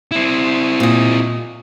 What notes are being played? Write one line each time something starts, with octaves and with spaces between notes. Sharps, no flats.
C4 E4
A#2 D#5